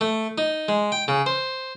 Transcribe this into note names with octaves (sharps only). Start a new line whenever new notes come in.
A3
D#4
G#3
G5
C#3
C5